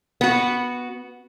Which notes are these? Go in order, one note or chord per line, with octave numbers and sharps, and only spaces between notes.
B3 F#4